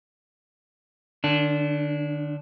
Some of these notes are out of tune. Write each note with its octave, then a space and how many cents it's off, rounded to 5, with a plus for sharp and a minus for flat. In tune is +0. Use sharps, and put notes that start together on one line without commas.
D3 +40 D4 -20